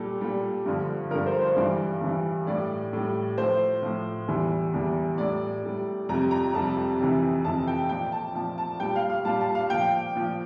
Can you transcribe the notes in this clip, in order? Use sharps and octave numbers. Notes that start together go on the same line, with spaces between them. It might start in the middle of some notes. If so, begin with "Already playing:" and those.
Already playing: A#2 G3 A4
A#2 G3
G2 D3 F3
G2 D3 F3 A#4
C5
C5
G2 E3 G3 D5
G2 E3 G3
A2 G3 D5
A2 G3
A2 F3 C5
A2 F3
E2 E3 G3
E2 E3 G3
A2 G3 D5
A2 G3
F2 C3 G3 A#5
A#5
F2 C3 G3 A5
F2 C3 E3
F2 C3 E3 A5
G5
A#2 F3 G5
A5
A#2 F3 A5
A5
A#2 G3 G5
F5
F5
A#2 G3 A5
A5
F5
A#2 F3 G5
A#2 F3